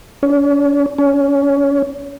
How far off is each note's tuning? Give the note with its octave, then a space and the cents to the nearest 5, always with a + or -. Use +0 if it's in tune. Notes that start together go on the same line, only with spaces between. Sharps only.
C#4 +45
C#4 +25